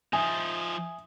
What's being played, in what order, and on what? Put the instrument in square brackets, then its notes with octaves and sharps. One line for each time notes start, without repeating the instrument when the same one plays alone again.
[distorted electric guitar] F3 D#4 [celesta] E5 D#6 [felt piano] G#5